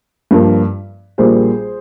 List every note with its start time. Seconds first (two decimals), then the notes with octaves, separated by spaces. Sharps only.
0.31 G2 F3 A#3
1.18 A#1 A#2 G3 A#3 G#4 C5